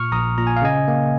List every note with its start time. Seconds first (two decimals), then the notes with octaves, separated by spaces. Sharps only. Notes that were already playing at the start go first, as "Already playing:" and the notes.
Already playing: A#2 C#6 F6
0.12 A#1 A#5 D#6
0.38 A#2 A#5
0.47 G#5
0.57 F5
0.62 C#3 D#5 G#5
0.88 A#3